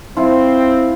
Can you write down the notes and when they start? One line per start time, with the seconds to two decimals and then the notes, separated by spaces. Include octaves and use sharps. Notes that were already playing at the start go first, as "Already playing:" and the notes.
0.17 C4 E4 F4